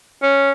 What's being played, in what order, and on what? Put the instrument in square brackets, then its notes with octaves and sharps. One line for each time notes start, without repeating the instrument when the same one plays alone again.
[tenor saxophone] C#4